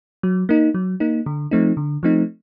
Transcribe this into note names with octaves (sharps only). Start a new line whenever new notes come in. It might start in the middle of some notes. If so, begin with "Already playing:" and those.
F#3
A#3 D#4
F#3
A#3 D#4
D3
F3 A3 C4 D#4
D3
F3 A3 C4 D#4